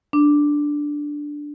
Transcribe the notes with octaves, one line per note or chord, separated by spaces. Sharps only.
D4